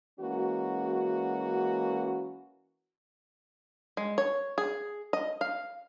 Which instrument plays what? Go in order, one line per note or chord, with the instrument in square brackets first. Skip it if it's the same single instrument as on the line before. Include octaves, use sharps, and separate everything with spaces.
[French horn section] E3 G#3 A#3 C#4 F#4
[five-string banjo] G#3
C#5
G#4
D#5
F5